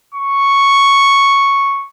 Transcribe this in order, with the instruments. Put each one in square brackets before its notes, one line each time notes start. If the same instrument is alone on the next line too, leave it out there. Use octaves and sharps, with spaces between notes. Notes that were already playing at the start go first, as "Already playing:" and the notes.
[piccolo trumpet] C#6